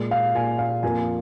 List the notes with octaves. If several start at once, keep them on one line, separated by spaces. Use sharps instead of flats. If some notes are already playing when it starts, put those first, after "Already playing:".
Already playing: A#2 G#3
F5
A#2 G#3 G#5
F5
F2 F3 A#3 G#5